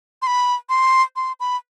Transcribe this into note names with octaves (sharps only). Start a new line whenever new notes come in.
C6
B5
C6
C6
B5